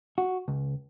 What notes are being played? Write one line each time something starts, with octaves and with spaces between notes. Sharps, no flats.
F#4
C#2